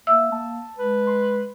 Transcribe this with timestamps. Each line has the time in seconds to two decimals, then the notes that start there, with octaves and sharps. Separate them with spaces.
0.07 A#3 E5 E6
0.32 A#3 A5
0.78 G#3 B4
1.07 C6